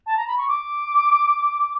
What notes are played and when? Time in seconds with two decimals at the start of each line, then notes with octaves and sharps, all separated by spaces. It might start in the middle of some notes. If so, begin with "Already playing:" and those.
0.06 A5
0.17 A#5
0.28 B5
0.38 C#6
0.48 D6